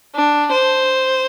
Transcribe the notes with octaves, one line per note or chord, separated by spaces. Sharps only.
D4
C5